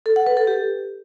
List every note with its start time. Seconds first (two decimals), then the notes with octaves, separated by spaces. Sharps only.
0.06 A4
0.16 F#5
0.27 B4
0.37 A4
0.47 G4